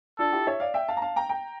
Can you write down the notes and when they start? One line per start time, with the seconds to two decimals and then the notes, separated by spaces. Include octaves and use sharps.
0.19 D4 F4 A4
0.33 E4 G4
0.47 C#5 E5
0.60 D5 F5
0.74 E5 G5
0.88 F5 A5
0.97 A#5
1.02 F5 A5
1.16 G5 A#5
1.29 G5 A#5